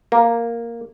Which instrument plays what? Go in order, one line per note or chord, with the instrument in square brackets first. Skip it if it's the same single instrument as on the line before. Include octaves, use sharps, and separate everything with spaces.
[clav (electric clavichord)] A#3